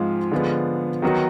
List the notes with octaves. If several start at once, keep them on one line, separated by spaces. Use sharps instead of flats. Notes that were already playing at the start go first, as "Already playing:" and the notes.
Already playing: G#2 F3 G#3 C4 F4
D3 F3 G#3 B3
D#3 F#3 B3 D#4 F#4